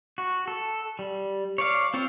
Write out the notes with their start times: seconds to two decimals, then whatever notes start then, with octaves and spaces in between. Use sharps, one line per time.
0.18 F#4
0.48 A4
0.99 G3
1.58 C#5 D5 F5
1.94 C4 F4 C#5